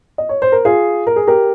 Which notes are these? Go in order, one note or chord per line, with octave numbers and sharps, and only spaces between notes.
D#5
C#5
C5
A#4
F4 G#4
A#4
G#4
G4 A#4